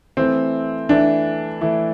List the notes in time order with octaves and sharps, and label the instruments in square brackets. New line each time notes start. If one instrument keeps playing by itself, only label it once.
[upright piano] E3 A3 E4 [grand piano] C4
[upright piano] E3 A3 E4 [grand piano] D4
[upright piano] E3 A3 E4